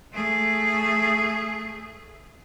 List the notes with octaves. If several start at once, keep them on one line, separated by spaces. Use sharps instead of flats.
A3 G#4